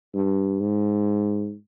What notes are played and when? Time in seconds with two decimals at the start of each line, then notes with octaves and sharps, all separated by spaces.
0.14 G2
0.60 G#2